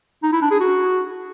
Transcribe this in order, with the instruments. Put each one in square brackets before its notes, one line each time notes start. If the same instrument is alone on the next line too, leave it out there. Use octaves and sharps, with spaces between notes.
[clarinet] D#4
E4
D4
G#4
F#4